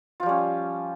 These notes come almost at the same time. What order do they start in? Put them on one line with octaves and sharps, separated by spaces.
F4 F3 G3 C#4